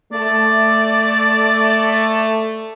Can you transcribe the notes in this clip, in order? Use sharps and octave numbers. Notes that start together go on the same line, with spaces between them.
A3 D5